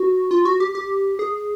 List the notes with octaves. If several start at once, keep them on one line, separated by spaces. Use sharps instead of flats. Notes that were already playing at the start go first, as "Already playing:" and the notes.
Already playing: F#4
F4
F#4
G4
G4
G#4